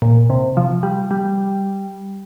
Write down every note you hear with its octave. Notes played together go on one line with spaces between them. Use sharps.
A#2
C3
F3
G3
G3